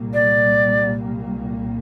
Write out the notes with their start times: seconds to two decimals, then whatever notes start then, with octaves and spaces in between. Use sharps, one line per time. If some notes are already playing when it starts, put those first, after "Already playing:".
Already playing: C2 A#2 G3 A#3
0.14 D5